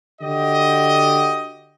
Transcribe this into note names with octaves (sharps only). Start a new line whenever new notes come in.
D3 F#4 G4 D#5